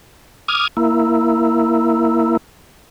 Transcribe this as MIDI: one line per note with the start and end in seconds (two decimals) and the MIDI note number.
0.48 0.68 86
0.48 0.68 87
0.48 0.68 89
0.48 0.68 92
0.77 2.37 58
0.77 2.37 64